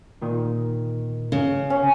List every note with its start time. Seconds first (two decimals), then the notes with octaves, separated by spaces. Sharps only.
0.22 A#2 D#3 D#4
1.32 C#3
1.70 C#4